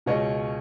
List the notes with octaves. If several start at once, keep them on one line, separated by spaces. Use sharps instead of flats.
C#2 B2 C#5 D#5